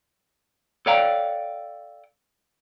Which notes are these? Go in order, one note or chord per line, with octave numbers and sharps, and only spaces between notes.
A4 C#5 D5 F5 G5 A#5